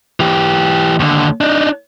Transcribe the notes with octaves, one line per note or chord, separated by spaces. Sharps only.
E3 G4
D#2 D3
D4 D#4